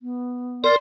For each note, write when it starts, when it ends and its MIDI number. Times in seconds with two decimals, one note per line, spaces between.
0.02 0.67 59
0.64 0.76 70
0.64 0.74 74
0.64 0.76 84